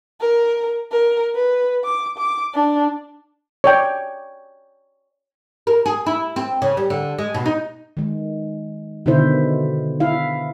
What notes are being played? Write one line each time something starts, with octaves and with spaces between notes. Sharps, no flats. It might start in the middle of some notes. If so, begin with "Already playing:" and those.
A#4
A#4
B4
D6
D6
D4
C#5 D5 G5
A#4
G#4
E4
C4
C#3
G3
D3
G#3
B2
D#4
D#3 G#3
B2 D3 D#3 E4 C5
E4 F5